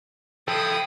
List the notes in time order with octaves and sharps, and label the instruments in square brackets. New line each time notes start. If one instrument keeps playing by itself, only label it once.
[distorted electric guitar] F3 E4 [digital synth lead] A4 [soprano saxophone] G5 [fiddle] D#6